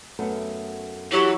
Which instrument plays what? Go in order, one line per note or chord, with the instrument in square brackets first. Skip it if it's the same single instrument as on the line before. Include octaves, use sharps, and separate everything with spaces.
[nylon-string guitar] F#2 A3 B3
[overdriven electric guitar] E3 [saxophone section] F#3 [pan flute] G4